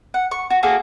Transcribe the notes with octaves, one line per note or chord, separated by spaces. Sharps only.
F#5
C#6
F#4
A#3 F#4 G#4 A4